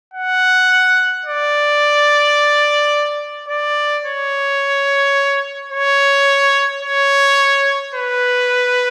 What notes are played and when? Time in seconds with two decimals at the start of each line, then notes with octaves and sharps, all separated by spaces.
0.14 F#5
1.26 D5
3.49 D5
4.04 C#5
5.72 C#5
6.82 C#5
7.94 B4